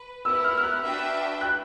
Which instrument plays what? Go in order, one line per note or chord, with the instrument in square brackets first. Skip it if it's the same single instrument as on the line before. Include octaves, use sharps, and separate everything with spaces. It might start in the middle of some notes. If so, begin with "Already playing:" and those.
Already playing: [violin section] B4
[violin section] B3 E4 G4 A#4 [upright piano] E6
[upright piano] F6
F6
F#6
[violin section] D4 F#4 B4 E5 G5
[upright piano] F#6